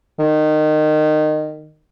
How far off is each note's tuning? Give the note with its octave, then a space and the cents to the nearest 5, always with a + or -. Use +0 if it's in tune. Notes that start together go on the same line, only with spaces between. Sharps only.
D#3 -20